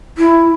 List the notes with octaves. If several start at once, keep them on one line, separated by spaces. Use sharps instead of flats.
E4